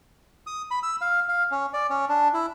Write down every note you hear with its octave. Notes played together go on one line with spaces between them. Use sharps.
D#6
B5
E6
F5
F5
C#4
D5
C#4
D4
E4